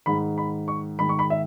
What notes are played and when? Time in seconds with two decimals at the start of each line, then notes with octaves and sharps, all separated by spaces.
0.06 G#2 D#3 G#3 B5
0.38 B5
0.68 C#6
0.99 G#2 D#3 G#3 B5
1.09 C#6
1.19 B5
1.30 E5